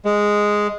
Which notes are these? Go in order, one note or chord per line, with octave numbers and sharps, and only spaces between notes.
G#3